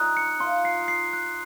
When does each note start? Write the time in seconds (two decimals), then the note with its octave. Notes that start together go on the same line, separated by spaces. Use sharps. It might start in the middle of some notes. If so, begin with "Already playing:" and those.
Already playing: D#4 F4 D#6 F#6
0.17 C#7
0.40 F4 C6
0.65 C7
0.88 C7
1.13 F#6